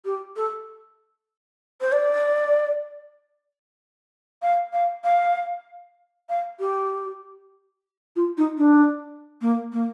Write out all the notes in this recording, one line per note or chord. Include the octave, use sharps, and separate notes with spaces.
G4
A4
C5
D5
F5
F5
F5
F5
G4
F4
D#4
D4
A#3
A#3